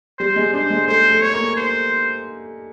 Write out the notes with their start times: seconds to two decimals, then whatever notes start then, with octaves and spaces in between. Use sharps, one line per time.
0.19 G3 C5
0.36 G#3
0.54 D4 C5
0.70 G#3
0.88 A3 C5
1.11 A3
1.22 C#5
1.34 A#3
1.56 C5